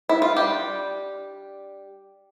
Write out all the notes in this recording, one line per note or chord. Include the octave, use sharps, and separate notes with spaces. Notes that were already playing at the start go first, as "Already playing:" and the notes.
E4
F4
G3 D4 G4